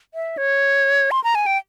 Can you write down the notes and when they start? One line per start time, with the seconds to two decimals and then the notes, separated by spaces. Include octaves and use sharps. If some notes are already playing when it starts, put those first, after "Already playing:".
0.14 E5
0.38 C#5
1.11 C6
1.24 A#5
1.35 G#5
1.46 G5